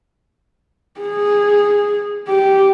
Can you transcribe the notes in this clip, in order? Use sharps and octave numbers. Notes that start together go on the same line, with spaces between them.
G#4
G4